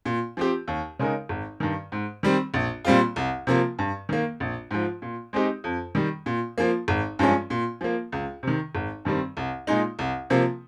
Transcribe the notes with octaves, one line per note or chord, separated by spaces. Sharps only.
A#2
F3 C4 G4
D#2
C#3 G#3 D#4 A#4
G#1
G2 D#3
G#2
D#3 G3 C4
A#1
A#2 G3 C4 F4
C2
C3 F3 A#3
G2
D#3 A#3
A#1
G#2 F3
A#2
G#3 C4 D#4 G4
F2
D#3 G3
A#2
F3 A#3
G#1
G2 F3 G#3 C#4
A#2
F3 A#3
C#2
C3 D#3
G#1
G2 D#3 G3 C4
C2
A#2 G#3 D#4
C2
C3 F3 A#3